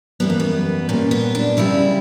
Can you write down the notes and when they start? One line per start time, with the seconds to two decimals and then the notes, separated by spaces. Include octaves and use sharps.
0.20 F#2 E3 G3 B3
0.30 A#3
0.40 B3
0.89 A#2 G3 C#4
1.11 B3
1.35 D4
1.57 D2 C#3 G3 E4